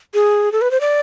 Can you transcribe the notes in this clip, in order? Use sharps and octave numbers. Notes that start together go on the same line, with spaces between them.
G#4
A4
B4
C5
D5